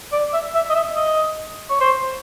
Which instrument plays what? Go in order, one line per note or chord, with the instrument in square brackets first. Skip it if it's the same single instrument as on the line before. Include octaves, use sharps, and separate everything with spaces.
[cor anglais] D5
E5
E5
D#5
E5
D#5
C#5
C5